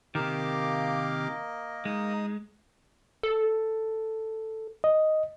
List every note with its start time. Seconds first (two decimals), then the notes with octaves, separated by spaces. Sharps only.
0.15 C3 D#3 A#3 G4 A#4 D#5 F5 D6
1.85 G#3 D#4 D#6
3.23 A4
4.84 D#5